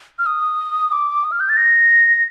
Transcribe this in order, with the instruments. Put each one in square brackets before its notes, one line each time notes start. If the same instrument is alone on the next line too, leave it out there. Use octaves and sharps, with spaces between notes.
[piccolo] F6
D#6
D6
D#6
F6
G6
A6
A#6